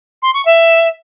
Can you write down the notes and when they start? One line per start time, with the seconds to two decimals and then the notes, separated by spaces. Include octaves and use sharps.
0.22 C6
0.34 C#6
0.45 E5